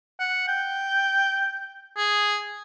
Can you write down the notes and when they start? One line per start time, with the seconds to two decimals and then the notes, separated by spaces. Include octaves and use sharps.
0.20 F#5
0.48 G5
1.97 G#4